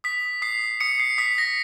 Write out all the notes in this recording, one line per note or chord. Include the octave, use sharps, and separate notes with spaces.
D#6 B6
D#6 C7
D#6 C#7
C7
D#6 B6
A#6